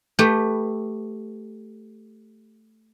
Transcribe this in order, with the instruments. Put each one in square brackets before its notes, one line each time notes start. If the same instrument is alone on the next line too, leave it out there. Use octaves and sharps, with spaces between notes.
[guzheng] A3 G4 B4